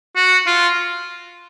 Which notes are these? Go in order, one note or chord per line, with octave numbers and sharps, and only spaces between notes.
F#4
F4